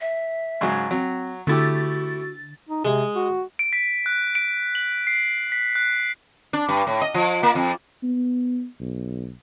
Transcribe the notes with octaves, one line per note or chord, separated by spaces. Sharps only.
E5
G#2 C#3 F#3
F#3 C4
D3 A3 E4 F#4 G4 A6
D#4
C3 G#3 G#4
F#4
D7
B6
F#6
D7
F#7
C7
B6
F#6
D4
G2
A2
D#5
F3
A#3
F2
B3
B1